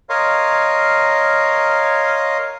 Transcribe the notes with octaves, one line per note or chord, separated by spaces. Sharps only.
A#4 C#5 D#5 F5 C6